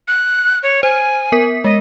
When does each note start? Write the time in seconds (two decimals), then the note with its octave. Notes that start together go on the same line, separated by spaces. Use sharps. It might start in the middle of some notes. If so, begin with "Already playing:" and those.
0.08 F#6
0.63 C#5
0.83 C5 G#5
1.32 B3 A#4 B6
1.64 G#3 D#5